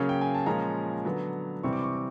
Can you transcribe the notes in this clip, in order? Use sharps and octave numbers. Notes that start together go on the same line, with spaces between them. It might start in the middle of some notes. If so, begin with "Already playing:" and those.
Already playing: C#3 F#3 A#3 C#4
G5
G#5
A5
A#2 F3 G#3 C#4 A#5
D3 F#3 B3
C3 E3 G3 C4 C#6
D6
C#6
D6